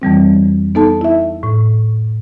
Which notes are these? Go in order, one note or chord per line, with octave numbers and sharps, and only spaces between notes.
F2 E3 G3 C4
B3 D#4 A4 A5
E4 E5
A2